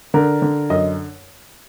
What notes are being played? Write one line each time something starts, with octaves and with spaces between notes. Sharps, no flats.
D3 A#4
D3
F#2 D#5